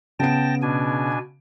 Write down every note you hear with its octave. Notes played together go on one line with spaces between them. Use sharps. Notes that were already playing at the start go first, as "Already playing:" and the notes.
C#3 B3 G5 A5 A#6 D7
B2 D4 G#5